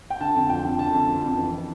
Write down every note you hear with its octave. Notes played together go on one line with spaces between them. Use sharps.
G5
D3 A5
F2
F3 G5
F2
D3 A5
F2
F3
F2
E3
E3